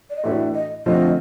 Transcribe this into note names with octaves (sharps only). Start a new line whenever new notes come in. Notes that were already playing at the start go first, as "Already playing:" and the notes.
D5
D#5
A2 E3 A3 D4 F#4 E5
D#5
D3 F3 A3 C4 F4 D#5